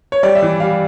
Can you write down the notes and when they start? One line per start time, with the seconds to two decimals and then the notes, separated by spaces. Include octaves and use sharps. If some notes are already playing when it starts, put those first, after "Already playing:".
0.12 C#5
0.23 G3 D5
0.35 E5
0.42 E3
0.60 G3 F5